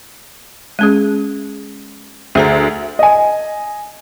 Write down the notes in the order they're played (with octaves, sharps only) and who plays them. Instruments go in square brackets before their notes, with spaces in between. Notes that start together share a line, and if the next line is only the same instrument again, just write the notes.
[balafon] G#3 C#4 G#4
[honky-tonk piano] D2 [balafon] G#4 C5 A#5
[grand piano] D#5 G#5